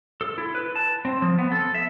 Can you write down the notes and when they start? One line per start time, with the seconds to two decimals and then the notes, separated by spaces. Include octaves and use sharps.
0.21 A4
0.38 E4
0.55 B4
0.75 A5
1.05 C4
1.22 F3
1.39 B3
1.52 A4
1.75 E5